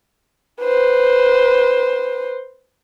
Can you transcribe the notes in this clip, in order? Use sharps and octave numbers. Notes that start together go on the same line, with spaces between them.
B4 C5